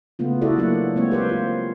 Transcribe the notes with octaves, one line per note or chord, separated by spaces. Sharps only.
C#3 A3 B3 F4
E4 F#4 A4 D5 D#5
F#3 A#3 D4 F#5
G#3 A#3 C4 C#5
G4 B4 C5
F4